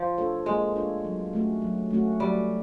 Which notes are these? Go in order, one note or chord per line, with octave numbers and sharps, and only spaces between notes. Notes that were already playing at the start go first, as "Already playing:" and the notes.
Already playing: F3
D4 F4 A4 C#5
G#3 A#3
D4 F4 A4 C#5
F#3
A3 C#4 F#4
F#3
A3 C#4 F#4
F#3 G3